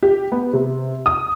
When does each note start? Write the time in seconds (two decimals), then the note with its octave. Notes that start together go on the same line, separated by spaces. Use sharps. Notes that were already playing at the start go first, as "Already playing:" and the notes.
0.03 G4
0.32 B3
0.53 C3
1.06 D#6